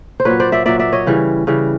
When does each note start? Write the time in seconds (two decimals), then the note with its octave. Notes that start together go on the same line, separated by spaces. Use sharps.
0.20 C5
0.25 A#2 F#3 B4 C#5
0.40 C5 D5
0.52 D5 E5
0.66 A#2 F#3 D5 E5
0.79 D5 E5
0.93 C#5 D#5
1.06 C#3 E3 G3
1.47 C#3 E3 G3